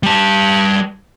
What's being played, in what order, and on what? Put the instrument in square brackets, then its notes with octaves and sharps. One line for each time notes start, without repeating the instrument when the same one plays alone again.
[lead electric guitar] G3 A5